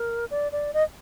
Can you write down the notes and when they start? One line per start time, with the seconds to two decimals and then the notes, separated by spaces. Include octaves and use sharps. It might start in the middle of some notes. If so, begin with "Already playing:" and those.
Already playing: A#4
0.31 D5
0.52 D5
0.74 D#5